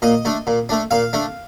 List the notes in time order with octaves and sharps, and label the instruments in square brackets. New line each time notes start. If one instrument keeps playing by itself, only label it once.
[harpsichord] A#2 D#5
A3 D4
A#2
A3 D4
A#2 F5
A3 D4